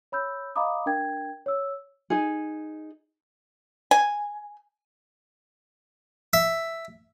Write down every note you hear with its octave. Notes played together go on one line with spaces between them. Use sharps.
C#5 B5 E6 G6
D#5 F5 A#5 B5 D6 D#6
D4 A#4 G5 G#6
C#5 E6
D#4 G#4
G#5
E5